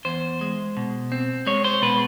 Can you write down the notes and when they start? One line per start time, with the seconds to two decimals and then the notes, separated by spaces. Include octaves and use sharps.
0.05 E2 C5
0.41 G#3
0.77 B2
1.12 C4
1.46 G#3 C#5
1.64 C5
1.82 B2 B4